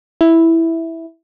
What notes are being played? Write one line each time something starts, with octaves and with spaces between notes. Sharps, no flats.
E4